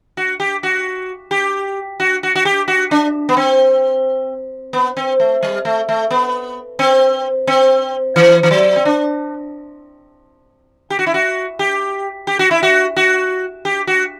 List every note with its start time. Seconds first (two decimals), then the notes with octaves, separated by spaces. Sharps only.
0.17 F#4
0.40 G4
0.63 F#4
1.31 G4
2.00 F#4
2.23 F#4
2.35 F#4
2.45 G4
2.68 F#4
2.91 D4
3.29 B3
3.37 C4
4.73 B3
4.97 C4
5.20 A3
5.43 G3
5.65 A3
5.89 A3
6.11 B3
6.79 C4
7.47 C4
8.16 E3
8.43 E3
8.51 F#3
8.76 C4
8.85 D4
10.90 G4
10.99 F#4
11.06 E4
11.14 F#4
11.59 G4
12.27 G4
12.39 F#4
12.51 E4
12.63 F#4
12.96 F#4
13.65 G4
13.87 F#4